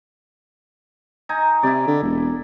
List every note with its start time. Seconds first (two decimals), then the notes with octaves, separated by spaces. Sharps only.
1.29 D#4 G#5 A#5
1.63 C3 E4 D5
1.87 D3
2.02 E1